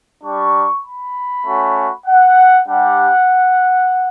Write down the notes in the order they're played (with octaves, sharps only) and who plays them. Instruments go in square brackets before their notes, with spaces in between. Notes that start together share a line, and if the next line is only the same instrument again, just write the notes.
[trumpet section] G3 D4 G4 C#6
B5
A3 C#4 F#4
F#5
G3 D4 G4 F#5